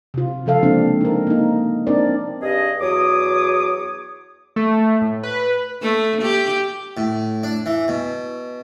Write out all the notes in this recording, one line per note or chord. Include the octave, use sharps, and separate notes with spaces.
C3 F4
C#3 F3 A4 F5
G#3 A#3 C4 D4
D#4 A#4
A#3 D#4
C4 D4 D#4 A#4 D5
G2 G#4 D#5
E2 F#3 C#5 D6 D#6
A3
A2
B4
A3
G4
A2
D4
E3
B2